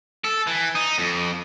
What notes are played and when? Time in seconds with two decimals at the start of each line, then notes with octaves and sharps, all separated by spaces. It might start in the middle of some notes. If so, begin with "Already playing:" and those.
0.24 A4
0.47 E3
0.75 D#4
0.98 F2